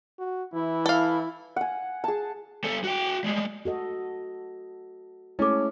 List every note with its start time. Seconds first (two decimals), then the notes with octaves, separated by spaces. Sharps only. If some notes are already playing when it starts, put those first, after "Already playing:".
0.19 F#4
0.54 E3 E4
0.86 A4 F5
1.56 F#5 G#5
2.04 G#4 A5
2.64 G3 A4
2.84 F#4 G5
3.24 G3 G#3
3.65 F#4 A4 D#5
5.39 G#3 A3 C#4 E4 A4 D6